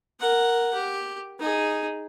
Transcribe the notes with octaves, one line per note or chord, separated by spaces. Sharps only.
A#4 F#5
G4
D#4 G#4